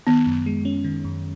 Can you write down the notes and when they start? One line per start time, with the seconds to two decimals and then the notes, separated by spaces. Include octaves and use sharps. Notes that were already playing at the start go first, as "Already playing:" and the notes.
0.07 D#3 B3
0.26 F#2
0.46 G#3
0.65 C#4
0.84 D#3
1.04 F#2